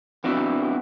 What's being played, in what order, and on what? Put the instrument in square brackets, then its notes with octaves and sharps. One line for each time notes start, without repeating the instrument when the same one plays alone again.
[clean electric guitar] B3 C4 D4 E4 F#4